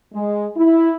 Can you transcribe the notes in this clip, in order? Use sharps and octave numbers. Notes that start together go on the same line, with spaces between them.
G#3
E4